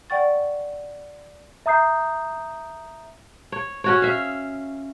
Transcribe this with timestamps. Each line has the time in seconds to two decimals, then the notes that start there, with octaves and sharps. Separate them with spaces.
0.10 D5 F#5 G5 C#6 A6
1.66 E5 A#5 D#6 G6 C7
3.52 C#5
3.84 C#4 F#4 C#5
4.02 E5 F5